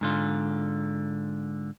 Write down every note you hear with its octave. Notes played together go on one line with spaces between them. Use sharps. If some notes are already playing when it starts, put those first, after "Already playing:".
G#2 D3 F4